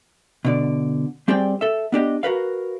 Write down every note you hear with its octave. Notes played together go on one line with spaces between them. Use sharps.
B2 D3 D5
G3 C4 G4 G#4 D5 G5
A4 E5
B3 D4 G4 D#5
F#4 A#4 B4 F5